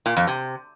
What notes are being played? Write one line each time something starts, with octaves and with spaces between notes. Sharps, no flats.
A#2
F2
C3